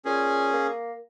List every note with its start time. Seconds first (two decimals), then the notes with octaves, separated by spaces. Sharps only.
0.05 A#2 C#4 G#4
0.53 A#3